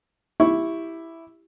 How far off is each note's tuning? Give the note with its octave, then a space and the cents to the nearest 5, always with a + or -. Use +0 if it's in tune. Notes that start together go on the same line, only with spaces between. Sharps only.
E4 +0 G4 +0 C#6 +0